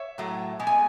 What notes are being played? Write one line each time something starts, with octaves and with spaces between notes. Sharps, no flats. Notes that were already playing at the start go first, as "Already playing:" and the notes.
Already playing: C#5 E5
A2 F#3 A3
B2 G#3
G#5